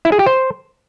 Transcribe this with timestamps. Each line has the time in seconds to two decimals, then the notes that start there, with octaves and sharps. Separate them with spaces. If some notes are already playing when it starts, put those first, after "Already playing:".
0.05 E4
0.12 G#4
0.19 G4
0.26 C5